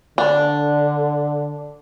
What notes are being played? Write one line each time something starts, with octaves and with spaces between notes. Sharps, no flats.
D3 D4